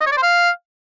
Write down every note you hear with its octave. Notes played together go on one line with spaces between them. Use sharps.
D#5
C#5
D5
C5
F5